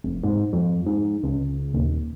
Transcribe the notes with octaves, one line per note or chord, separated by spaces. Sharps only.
F1
G#2
F2
G#2
C#2
D#1